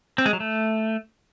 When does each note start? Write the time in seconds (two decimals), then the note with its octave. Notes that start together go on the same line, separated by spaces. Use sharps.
0.18 C4
0.26 G#3
0.33 F#3
0.40 A3